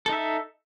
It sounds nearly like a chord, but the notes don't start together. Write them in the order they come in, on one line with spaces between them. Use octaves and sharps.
A4 D#4 E5